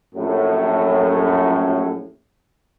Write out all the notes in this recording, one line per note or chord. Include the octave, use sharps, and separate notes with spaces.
A#1 F#2 A2